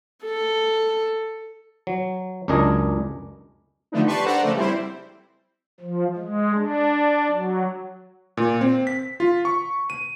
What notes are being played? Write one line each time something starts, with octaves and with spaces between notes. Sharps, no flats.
A4
F#3
C#2 F#2 D4 A#4 D#5 G#5
D3 F3 A3 B3 D4 D#4
G4 B4 D5 A5 C6 C#6
D4 A4 C5 D5 F#5 A#5
C#3 F3 A3 B4
G3 C4 E4 C5
F3
G#3
D4
F#3
A#2
C4
B6
F4
C#6
D#7